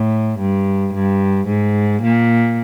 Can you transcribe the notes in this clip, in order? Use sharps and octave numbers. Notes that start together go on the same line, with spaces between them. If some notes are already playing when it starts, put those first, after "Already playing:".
Already playing: A2
G2
G2
G#2
A#2